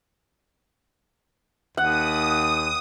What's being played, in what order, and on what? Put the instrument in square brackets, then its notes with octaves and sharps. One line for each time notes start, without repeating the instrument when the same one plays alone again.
[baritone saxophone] D#2 [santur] F#5 [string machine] D#6